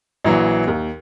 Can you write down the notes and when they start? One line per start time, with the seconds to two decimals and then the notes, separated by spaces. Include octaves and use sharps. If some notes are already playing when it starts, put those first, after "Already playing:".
0.24 A#1 E3 F#3
0.67 D#2